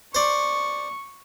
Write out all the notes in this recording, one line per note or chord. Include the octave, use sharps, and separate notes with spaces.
C5 D5 C#6